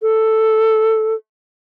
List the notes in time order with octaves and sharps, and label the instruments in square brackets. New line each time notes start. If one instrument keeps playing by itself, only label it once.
[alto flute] A4